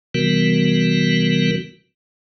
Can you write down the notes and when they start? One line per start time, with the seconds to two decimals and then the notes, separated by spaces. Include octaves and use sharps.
0.14 C3 E3 G3 B3 F#4 A#4